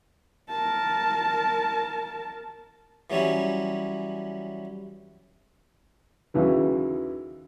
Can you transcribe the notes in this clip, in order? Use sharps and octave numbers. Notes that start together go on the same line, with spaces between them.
A#4 A5
E3 F#3 G3 C#4 E4
D#2 C#3 E3 F#3